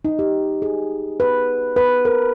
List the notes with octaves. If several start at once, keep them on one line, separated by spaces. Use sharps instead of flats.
D#4
G4
G#4
B4
B4
A#4